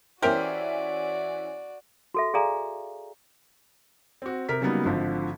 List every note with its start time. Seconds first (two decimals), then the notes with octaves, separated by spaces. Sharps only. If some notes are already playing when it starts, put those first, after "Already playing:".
0.22 E3 C#4 F#4 G4 A#4 C5 D5 E5
2.14 F#4 A4 E5
2.34 G#4 A4 D5 F5 G#5 A#5
4.22 C4 F#4
4.49 C3 A#4 B6
4.61 C#3 F#3 G3 A#3 B3 D#4
4.85 G#1 D3 F3